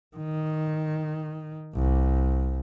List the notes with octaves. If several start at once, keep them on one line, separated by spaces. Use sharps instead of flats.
D#3
C2